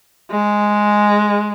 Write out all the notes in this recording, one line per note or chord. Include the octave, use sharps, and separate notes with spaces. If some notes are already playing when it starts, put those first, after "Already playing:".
G#3